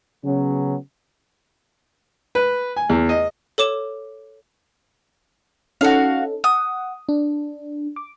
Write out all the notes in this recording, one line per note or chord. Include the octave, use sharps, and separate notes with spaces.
C#3 F#3 B3 C#4
B4
G#5
E2
D#5
A4 C#5 D6 E7
C#4 D#4 F#4 A4 F5
F#5 D#6
D4
D6